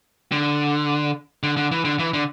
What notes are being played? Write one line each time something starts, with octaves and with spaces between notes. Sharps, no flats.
D3
D3
D3
E3
D3
E3
D3